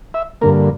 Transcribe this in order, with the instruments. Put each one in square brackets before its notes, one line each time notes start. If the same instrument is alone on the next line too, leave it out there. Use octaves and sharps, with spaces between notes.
[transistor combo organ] E5
G2 D3 A#3 A#4